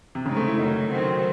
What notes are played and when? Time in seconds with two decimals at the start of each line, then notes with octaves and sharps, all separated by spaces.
0.15 C3
0.26 A2 C#3 G#3 C4 D#4
0.37 A3
0.48 E4
0.59 F#2 D#3 F#3 A3 D#4
0.91 D#3 F#3 C4 F#4